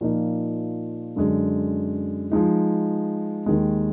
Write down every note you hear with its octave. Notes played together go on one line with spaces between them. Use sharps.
A#2 F3 A#3 D#4
F#2 D3 G#3
F3 G#3 D#4
D#2 D#3 G#3